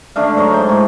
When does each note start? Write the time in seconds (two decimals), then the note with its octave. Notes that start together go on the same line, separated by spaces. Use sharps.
0.16 D3 A3 D4 F5
0.36 G#2 F#3 A#5 C#6
0.54 G#2 G5
0.69 A2